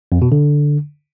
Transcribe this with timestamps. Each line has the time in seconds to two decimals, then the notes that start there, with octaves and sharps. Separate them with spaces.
0.12 F2
0.22 B2
0.32 D3